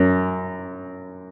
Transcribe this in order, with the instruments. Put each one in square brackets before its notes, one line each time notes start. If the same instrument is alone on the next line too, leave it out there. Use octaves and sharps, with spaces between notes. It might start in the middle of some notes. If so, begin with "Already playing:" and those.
Already playing: [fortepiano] F#2